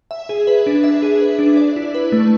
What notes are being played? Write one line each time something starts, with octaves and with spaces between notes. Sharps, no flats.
E5
G#4
B4
D4
E5
G#4
B4
D4
D5
E4
B4
A3